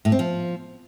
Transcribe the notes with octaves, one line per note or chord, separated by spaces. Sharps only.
A2
C4
F3